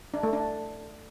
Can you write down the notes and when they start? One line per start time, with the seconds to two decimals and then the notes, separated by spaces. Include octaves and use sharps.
0.14 D4
0.23 A3
0.33 D4